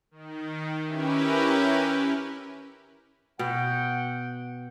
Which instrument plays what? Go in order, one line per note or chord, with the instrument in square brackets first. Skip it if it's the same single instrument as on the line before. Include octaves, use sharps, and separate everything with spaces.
[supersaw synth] D#3
C#4 E4 G4 A#4 B4
[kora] B2 [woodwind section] F#5 G5